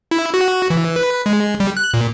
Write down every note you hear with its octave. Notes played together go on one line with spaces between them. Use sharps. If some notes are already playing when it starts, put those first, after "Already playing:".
E4
F#4
E3
B4
G#3
G3
F#6
A#2